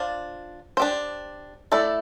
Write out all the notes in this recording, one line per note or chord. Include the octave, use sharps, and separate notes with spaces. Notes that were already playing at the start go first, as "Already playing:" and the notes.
Already playing: D4 F4 C5
D4 G4 C5
A3 E4 A4 D5